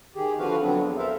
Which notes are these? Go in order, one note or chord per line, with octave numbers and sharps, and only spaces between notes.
D#3 G4 G#4
D3 F3 C4 F#4 B4 F5
D3 F3 F#3 B3 C4 D4
E2
A4 A#4 C5 E5 F5